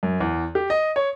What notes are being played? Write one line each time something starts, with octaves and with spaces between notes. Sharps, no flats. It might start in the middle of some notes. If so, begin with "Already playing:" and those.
F#2
E2
G4
D#5
C#5